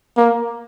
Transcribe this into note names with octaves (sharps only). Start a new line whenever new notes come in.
A#3